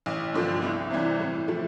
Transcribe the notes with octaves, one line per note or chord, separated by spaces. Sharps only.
A1
G2 D3 F3
C2
C3 E3 G3
A2
F3 A3